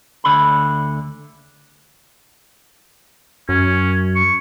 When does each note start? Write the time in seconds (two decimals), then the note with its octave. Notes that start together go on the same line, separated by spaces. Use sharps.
0.24 D2 D3 B5
3.49 F#2 C#4
4.15 C#6